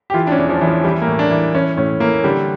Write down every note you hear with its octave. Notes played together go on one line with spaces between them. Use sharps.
G4
E3 F4
D4
C#4
E2
F3
E3
F3
E3 G3
A#3
A2
D4
E3
E3 C#4
A2 C#4
E3 A#3
D3 G3